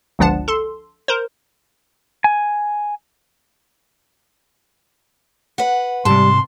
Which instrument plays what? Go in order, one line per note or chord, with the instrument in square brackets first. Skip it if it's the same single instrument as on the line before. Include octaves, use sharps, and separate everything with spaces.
[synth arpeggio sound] G1 C#2 F3 D4 F#5 A5
A4 C6
A#4 C5
[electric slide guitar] G#5
[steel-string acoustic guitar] B4 F#5
[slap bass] G#2 C3 [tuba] G3 [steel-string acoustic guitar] A5 [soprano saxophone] C6